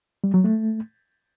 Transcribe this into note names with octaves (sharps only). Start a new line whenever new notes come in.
G3
F#3
A3